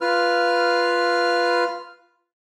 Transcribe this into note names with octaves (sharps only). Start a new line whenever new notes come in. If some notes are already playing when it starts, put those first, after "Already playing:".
F4 B4 F6